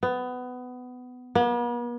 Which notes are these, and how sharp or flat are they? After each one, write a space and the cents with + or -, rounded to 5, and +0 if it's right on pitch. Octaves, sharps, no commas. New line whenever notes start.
B3 +20
B3 -45